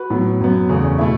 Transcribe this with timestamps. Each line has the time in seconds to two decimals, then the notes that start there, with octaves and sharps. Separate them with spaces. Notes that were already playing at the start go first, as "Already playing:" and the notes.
Already playing: F#4 B4
0.10 A2 F#3 B3
0.40 F#2 F#3 B3
0.69 E2 C#3 A3
0.84 C#4
0.98 B2 A3 E4